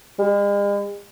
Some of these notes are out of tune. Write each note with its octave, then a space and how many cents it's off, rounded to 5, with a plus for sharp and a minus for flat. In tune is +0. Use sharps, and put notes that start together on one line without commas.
G#3 -45